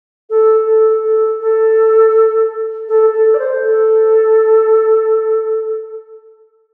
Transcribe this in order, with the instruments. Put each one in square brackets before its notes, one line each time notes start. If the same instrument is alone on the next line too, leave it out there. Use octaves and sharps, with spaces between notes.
[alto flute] A4
A4
A4
A4
A4
A4
D5
C5
A4